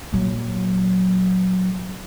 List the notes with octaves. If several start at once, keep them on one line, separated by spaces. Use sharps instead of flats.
A#2 F#3